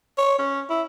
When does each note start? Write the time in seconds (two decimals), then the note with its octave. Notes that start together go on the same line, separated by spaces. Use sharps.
0.18 C#5
0.39 C#4
0.70 E4